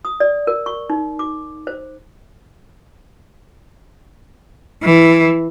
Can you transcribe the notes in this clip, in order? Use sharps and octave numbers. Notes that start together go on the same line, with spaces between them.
D#6
D5
A#4
C#6
D#4
D6
C5
E3